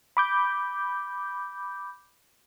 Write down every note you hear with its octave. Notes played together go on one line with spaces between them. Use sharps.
B5 D6 G6